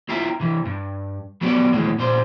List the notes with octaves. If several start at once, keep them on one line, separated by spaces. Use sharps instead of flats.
E4 F4 E5 G5 A#5
C3 E3
G2
F#3 B3 F#4 G4 D5
D#2 A2 E3 F#3 G#3
A#2 G3 C5